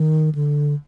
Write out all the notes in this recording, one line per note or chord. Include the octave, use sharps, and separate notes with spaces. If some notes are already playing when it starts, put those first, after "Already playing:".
Already playing: D#3
D3